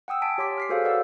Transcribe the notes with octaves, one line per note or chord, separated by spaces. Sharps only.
F#5 G5 D#6 E6
G#5 A5 B6 D7
G4 C#5 C6 D6 B6
F6 B6 C7
F#4 G#4 A4 C5 C#5 F5
B4 C#5 D5 F5 F#5 E6